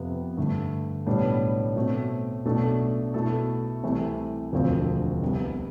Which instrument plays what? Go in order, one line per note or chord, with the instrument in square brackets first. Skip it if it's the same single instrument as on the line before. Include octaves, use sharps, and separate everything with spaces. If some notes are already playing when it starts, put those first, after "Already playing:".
Already playing: [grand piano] F2 C3 F3 B3
G2 D3 A3
B1 A2 G3 B3 D4
B2 A3 C4
B1 B2 A3 D4 A4
B2 A3 E4 A4
C2 C3 E3 A3 C4
E1 D2 D3 F3 C4
C2 C3 G3 B3